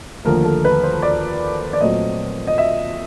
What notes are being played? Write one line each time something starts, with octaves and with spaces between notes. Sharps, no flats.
D#2 D3 F3 A3 A#4
A4
B4
C5
D5
D5
A#2 F#3 A3 C4 D#5
D#5
E5